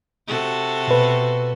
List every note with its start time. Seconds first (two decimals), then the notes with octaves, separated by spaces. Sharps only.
0.27 C3 F#4 A4
0.88 B2 B4